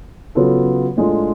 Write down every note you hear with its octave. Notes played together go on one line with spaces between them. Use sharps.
C#3 F#3 B3 F4 A4
A2 G#3 D4 F4